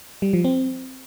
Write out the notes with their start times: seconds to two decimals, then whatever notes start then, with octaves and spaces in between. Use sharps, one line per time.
0.22 G3
0.33 F3
0.44 C4